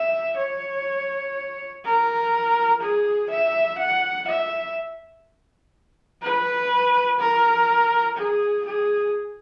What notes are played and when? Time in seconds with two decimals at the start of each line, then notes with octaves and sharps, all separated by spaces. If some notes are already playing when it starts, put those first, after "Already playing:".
Already playing: E5
0.37 C#5
1.84 A#4
2.81 G#4
3.30 E5
3.79 F#5
4.27 E5
6.22 B4
7.19 A#4
8.17 G#4
8.65 G#4